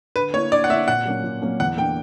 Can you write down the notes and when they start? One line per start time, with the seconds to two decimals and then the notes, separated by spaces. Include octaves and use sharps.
0.16 D3 B4
0.34 A#3 C#5
0.37 E4
0.52 D3 D5
0.64 F#5
0.69 A#3 E5
0.73 E4
0.88 A#2 F#5
1.05 F#3 A#3 C#4
1.24 A#2
1.42 F#3 A#3 C#4
1.60 E2 F#5
1.78 D3 A#3 G5